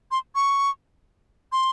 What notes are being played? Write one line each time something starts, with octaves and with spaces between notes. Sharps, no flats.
C6
C#6
C6